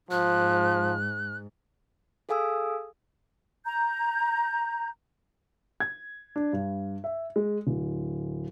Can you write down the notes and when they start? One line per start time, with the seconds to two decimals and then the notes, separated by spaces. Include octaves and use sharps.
0.11 G#2 F3 F#6
2.29 G#4 A4 F5 G#5 D#6 E6
3.65 A#5 G6
5.80 G#6
6.36 D4
6.53 G2
7.04 E5
7.36 G#3
7.67 D1